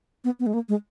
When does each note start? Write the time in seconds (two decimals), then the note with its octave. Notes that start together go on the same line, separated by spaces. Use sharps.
0.24 B3
0.40 B3
0.46 G#3
0.54 A#3
0.69 G#3